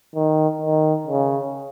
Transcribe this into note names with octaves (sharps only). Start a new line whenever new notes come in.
D#3
D#3
C#3